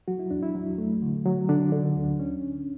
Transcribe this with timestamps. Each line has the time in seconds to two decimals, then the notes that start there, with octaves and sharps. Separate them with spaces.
0.08 F#3 F#4
0.19 E4
0.31 E2 D4
0.43 E4
0.55 F#3
0.78 A3
1.02 D3
1.26 F#3
1.49 D3 D4
1.72 D3
1.96 D2
2.20 C#4